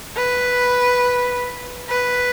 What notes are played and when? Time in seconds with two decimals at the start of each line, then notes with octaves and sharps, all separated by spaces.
0.16 B4
1.89 B4